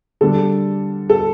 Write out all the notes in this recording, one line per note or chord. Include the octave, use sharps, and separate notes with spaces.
D3 G3 D4 A4
A4